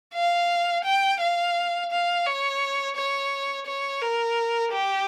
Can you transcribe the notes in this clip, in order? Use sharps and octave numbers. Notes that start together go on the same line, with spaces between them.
F5
G5
F5
F5
C#5
C#5
C#5
A#4
G4